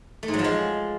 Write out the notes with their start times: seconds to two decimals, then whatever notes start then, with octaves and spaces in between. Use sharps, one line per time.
0.23 A3
0.28 G#2
0.33 F#3
0.39 F3
0.44 G#3